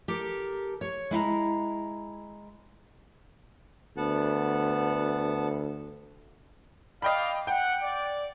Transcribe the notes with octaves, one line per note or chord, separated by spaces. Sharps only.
G4 A4 A#4
C#5
G#3 E4 F5 A#5
D2 B3 F#5 A5
D5 D#5 F5 G5 B5
F#5 G5
D5